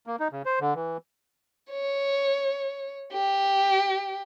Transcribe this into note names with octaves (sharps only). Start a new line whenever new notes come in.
A#3
D#4
C#3
C5
D3
E3
C#5
G4